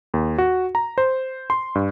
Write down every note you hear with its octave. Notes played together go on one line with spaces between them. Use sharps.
D#2
F#4
A#5
C5
C6
G2